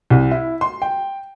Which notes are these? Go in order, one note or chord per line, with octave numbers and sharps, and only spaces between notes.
C2
E4
C6
G5